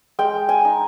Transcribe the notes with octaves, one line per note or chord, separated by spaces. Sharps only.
G#3 G5
G#5
D#4